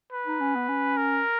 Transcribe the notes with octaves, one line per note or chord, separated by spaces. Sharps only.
B4
D#4
C#4
B3
C#4
A#4